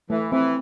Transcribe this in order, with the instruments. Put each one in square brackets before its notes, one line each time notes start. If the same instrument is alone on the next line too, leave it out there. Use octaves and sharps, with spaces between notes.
[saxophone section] E3 [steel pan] A3
[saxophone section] E3 [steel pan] C4